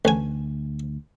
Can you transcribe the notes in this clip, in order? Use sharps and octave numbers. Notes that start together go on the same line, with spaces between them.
A1 D2 G#5